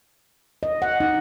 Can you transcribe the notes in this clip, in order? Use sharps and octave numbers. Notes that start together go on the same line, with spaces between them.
D#5
F#5
D#4